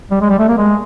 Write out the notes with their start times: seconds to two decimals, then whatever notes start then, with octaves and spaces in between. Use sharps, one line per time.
0.11 G3
0.21 G#3
0.30 G3
0.39 A3
0.49 A#3
0.58 G#3